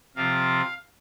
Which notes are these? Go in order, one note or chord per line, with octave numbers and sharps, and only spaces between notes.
C3 F3 C4 F4 F5